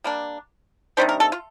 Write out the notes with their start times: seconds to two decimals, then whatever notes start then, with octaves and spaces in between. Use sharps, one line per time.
0.04 G3 A#3 D4
0.97 C3 D#3 G3 D4 C5
1.09 A#4
1.20 A4
1.32 F4